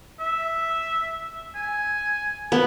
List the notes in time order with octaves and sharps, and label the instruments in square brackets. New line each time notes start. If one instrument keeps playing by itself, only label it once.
[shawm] E5
G#5
[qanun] B3